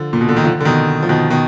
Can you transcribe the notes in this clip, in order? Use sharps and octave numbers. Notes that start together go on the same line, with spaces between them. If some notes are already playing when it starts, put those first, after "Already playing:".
Already playing: D3 F3
A#2
B2
D3
D#3
D3 F3
D3
B2 D#3
F3
B2 D#3
B2 D#3